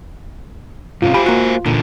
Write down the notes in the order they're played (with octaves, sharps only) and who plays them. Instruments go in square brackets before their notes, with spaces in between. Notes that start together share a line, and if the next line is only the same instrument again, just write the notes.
[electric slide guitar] G#2 C3 C#4 [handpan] F4
[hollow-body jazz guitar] G4 B5 [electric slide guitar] C5 F5 G#5
[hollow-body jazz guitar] A#3 F#4
[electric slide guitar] E2 D3 [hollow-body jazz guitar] A#2